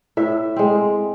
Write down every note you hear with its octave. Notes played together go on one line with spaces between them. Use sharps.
A2 E5
G#3 C4